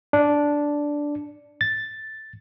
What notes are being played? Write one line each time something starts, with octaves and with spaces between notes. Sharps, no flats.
D4
A6